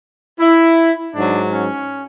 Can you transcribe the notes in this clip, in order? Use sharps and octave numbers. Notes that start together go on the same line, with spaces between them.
E4
G#2 F#3 D4
C#4